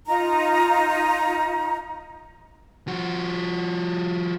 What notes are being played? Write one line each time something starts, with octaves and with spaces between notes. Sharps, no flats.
D#4 F4 A#5
F3 F#4